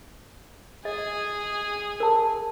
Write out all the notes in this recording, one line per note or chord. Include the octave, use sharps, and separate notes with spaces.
G#4 D#5
A#4 A5